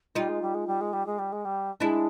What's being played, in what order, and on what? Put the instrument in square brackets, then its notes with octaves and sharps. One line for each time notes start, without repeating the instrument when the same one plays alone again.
[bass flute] G3 [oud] D#4 F4
[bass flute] G#3
G3
G#3
G3
G#3
G3
G#3
G3
G#3
G3
[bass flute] G#3 [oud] D4 E4